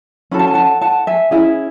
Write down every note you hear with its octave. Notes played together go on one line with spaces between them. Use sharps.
C#4 F#4 A4 B5
A5
G#5
F#5 A5
F#5 A5
E5 G#5
C#4 E4 G#4 E5 G#5